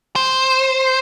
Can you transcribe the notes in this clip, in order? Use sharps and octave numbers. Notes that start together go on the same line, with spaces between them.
C5